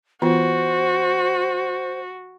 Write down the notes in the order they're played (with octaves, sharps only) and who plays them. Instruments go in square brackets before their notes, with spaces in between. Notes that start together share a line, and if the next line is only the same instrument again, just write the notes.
[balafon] E3 B3 F4 [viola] F#4 [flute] C5